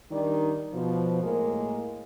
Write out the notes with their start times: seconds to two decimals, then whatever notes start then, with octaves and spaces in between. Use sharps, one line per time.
0.12 D#3 G3 D4 D#4 A#4 D5
0.74 B2 F3
1.23 A2 G#3 A#3 A#4